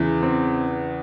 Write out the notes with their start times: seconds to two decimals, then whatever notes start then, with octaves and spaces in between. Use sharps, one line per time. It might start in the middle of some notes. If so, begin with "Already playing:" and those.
Already playing: E2 C#3 E3
0.23 C4